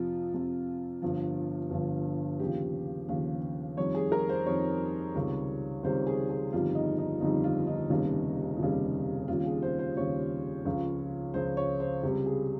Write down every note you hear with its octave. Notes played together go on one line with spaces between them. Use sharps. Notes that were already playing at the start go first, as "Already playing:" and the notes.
Already playing: F2 C3 F3 F4
F2 C3 F3
G1 G2 F3
G1 G2 F3
D#2 C#3 F3 G4
D#2 C#3 F3
F2 D#3 G3 C#5
G#4
A#4
C5
F2 D#3 G3 C#5
C#2 C3 D#3 G3
C#2 C3 D#3 G3 C5
G#4
G#4
G1 F2 D#3 G3 F4
D#4
D#4
G1 F2 D#3 G3 D#4
F4
D#4
F1 D#2 C#3 G3
F1 D#2 C#3 G3
D#2 C#3 G3 F4
G#4
C5
C5
D#2 C#3 G3 C#5
C#2 C#3 F3
C#2 C#3 F3 C5
C#5
C5
C#2 C3 G3 G4
G#4